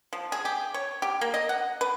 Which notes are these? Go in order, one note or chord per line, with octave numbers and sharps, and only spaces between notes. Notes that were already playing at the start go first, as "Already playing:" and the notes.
F3
G#4
G4
C#5
G4
A#3
D#5
F#5
B4